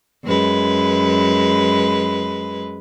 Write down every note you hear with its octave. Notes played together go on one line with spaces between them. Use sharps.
F#2 G#3 B4